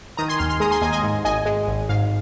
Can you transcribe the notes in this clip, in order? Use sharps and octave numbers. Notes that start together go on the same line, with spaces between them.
D#3 A#5 D#6
G#5 C6
D#2 C6 F6
C6 F6
G#3 A#5 D#6
G#5 C6
D#2 D#5 G#5
D#5 G#5
G#2
G#1 D#5 G#5
G#3
G#1
G#2 F5